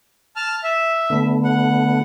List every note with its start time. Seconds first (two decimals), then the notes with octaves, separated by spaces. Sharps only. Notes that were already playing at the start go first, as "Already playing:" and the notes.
0.36 A5 F6
0.63 E5
1.10 D3 A3 B3
1.45 F#5